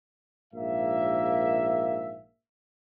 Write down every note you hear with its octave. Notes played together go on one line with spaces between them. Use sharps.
A#1 G#2 A#3 E5